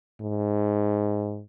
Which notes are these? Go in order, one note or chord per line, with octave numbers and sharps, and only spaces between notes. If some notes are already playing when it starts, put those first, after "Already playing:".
G#2